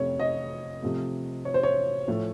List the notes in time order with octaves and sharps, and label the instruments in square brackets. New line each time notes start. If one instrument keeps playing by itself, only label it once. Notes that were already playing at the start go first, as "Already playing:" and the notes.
Already playing: [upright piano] F2 C3 A3 C#5
D#5
C3 F3 A3
C#5
C5
C#5
A2 F3 A3